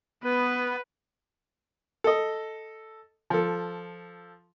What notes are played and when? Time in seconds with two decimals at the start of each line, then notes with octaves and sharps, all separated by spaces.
0.24 B3 B4
2.04 A4 D#5
3.30 F3 A4